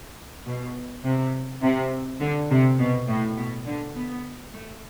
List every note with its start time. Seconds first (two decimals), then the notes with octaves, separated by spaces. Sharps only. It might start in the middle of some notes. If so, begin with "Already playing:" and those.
0.46 B2
1.04 C3
1.62 C3
2.21 D3
2.50 C3
2.79 B2
3.08 A2
3.37 B2
3.66 D3
3.95 B3
4.53 A3